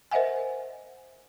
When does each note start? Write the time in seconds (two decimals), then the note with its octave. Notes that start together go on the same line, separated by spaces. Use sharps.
0.11 A#4 C5 D#5 E5 F#5 G#5